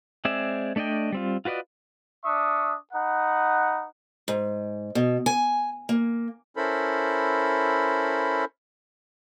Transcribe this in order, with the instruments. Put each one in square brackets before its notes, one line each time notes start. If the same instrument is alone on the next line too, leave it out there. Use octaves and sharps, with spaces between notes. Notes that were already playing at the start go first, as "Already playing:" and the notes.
[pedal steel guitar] G#3 C4 G#4 D5 E5
A3 D4 D5 D#5 G5
G3 C4 F4
F4 F#4 B4 D5 D#5
[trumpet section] D4 E5 C#6 D#6
D#4 B4 F#5
[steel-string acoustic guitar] G#2
B2
G#5
A#3
[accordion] C#4 E4 A4 A#4 C5 B5